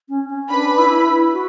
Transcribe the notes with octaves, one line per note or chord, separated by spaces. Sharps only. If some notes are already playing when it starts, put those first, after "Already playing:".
C#4
C#4
D4 B4 B5
E4
F#4